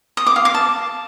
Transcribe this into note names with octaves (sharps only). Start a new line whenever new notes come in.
D#6
D6
F5
D6
A5